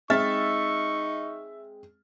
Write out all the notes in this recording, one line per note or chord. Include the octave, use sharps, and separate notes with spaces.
G#3 C4 D#4 E5 C#6 E6 F6 A6